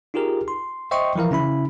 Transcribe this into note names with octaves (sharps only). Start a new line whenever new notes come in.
D#4 F4 G4 G#4 A#4
C6
C5 D#5 E5 G5 C6 C#6
E3 F3 E4 A#4 F5
C#3 C#4 E4 B5